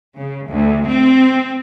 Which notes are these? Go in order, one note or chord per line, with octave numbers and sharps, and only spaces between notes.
C#3
D2
C4